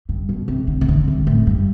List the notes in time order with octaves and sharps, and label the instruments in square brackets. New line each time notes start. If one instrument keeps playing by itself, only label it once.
[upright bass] G2
B2
C3
D3
C3
D3
C3
A2
G2